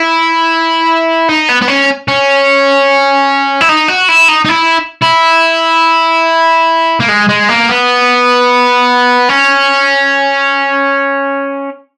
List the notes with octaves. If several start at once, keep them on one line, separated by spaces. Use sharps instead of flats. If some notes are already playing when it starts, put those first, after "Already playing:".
Already playing: E4
D#4
B3
B3
C#4
C#4
E4
D#4
F#4
E4
D#4
D#4
E4
E4
A#3
G#3
G#3
A#3
B3
C#4